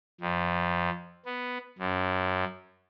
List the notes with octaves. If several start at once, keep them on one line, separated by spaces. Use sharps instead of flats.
F2
B3
F#2